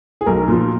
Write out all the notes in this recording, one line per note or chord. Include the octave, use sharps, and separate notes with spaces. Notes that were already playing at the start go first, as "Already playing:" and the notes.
G#4
B1 A#4
A#2 F3